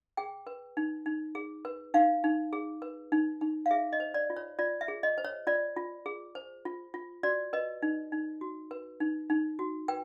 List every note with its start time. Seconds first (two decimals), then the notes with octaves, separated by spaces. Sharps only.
0.17 G#4 G5
0.47 B4
0.77 D#4
1.06 D#4
1.35 G#4
1.65 B4
1.94 D#4 F5
2.24 D#4
2.53 G#4
2.82 B4
3.12 D#4
3.41 D#4
3.66 F5
3.71 G#4 E5
3.93 D#5
4.00 C5
4.14 D5
4.30 F4
4.37 C#5
4.59 F4 D5
4.81 E5
4.88 G#4
5.03 D#5
5.18 C5
5.25 C#5
5.47 F4 D5
5.77 F4
6.06 G#4
6.35 C5
6.65 F4
6.94 F4
7.23 F#4 D5
7.53 B4 D#5
7.82 D#4
8.12 D#4
8.41 F#4
8.71 B4
9.00 D#4
9.30 D#4
9.59 F#4
9.88 B4 G5